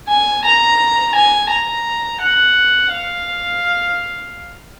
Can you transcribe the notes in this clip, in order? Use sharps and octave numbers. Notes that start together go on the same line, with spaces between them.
G#5
A#5
G#5
A#5
F#5
F5